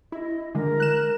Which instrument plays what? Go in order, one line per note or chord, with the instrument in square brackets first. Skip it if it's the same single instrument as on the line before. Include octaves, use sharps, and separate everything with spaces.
[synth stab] E4 [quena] D#5
[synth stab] D3 G#3 [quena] A#4
[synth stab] F#6 E7